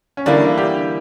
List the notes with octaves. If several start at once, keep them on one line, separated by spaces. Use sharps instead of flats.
C#4
E2 D3 G3 A#3 D4 E4
G4